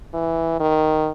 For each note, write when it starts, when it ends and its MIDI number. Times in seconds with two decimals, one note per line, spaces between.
0.14 0.57 52
0.60 1.10 51